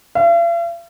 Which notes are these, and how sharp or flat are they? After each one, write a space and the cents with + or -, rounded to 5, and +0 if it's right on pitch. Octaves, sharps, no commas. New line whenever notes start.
F5 -45